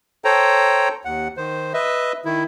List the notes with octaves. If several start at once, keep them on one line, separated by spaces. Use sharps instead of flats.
A4 C5 C#5 G5 A#5
D#2 F#5
D#3 C5
B4 D#5 E5
D#3 E4